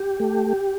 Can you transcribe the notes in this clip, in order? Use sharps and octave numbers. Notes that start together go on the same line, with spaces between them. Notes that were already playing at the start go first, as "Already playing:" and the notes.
Already playing: G4
A3